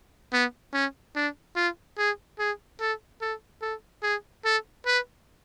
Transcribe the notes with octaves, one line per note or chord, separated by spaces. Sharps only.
B3
C#4
D4
F4
G#4
G#4
A4
A4
A4
G#4
A4
B4